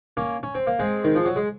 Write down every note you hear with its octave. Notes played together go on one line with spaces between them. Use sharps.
A#3 C#4
C#4
C4
A#3
G#3 C4
D#3
F3
F#3
G#3